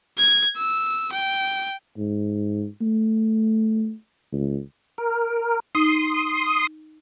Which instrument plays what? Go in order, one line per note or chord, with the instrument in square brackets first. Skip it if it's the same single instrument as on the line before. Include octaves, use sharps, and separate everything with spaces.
[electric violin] G#6
E6
G5
[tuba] G#2
A3
C#2
[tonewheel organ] A#4
[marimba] D#4 [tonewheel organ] C6 D#6